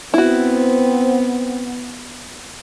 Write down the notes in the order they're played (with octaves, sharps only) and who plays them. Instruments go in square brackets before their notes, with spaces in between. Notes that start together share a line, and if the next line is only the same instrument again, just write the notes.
[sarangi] B3 [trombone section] C4 [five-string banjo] E4 F#4